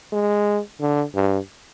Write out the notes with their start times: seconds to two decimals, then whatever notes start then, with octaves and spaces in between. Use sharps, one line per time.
0.12 G#3
0.80 D3
1.15 G2